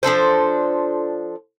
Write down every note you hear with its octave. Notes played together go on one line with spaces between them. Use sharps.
F3 D4 A4 C5